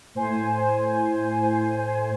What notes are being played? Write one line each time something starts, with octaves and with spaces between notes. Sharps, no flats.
A2 C5 G#5